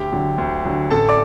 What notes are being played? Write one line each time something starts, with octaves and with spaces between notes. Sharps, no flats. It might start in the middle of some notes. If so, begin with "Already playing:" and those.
Already playing: D2 G4 G5
D3 F#3
D2
D3 F#3
A1 A4 A5
D5 D6